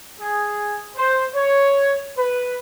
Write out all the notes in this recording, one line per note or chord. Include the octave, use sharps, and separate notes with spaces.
G#4
C5
C#5
B4